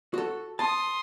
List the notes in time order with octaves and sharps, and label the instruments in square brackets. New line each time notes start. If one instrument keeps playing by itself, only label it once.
[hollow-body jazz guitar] F#4 A4
[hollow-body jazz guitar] A5 [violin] C6 D#6